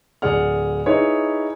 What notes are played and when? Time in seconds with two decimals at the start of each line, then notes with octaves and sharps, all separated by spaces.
0.22 D1 G#4 D5 F#5 F6
0.86 D#4 E4 G#4 B4 C#5